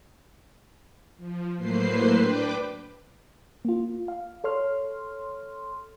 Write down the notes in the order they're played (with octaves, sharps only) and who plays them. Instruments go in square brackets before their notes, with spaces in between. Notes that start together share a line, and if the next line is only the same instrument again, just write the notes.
[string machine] F3
A2 F#3 A#3 B4 C5 C7
D4 B4 G5 D6
[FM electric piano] A#3 F4
F5
A4 C#5 C6 F6